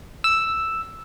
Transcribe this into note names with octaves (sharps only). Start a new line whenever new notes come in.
E6